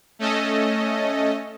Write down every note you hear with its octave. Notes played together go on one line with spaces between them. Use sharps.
A3 C#4 A4 D#5